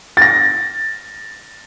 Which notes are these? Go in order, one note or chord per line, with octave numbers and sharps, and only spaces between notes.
A6 A#6